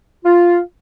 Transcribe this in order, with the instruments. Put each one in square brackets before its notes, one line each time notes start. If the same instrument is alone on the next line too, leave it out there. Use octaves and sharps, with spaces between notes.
[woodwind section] F4